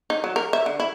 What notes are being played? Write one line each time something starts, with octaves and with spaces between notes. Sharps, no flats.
D#4
F#3
A#4
E5
D3
E4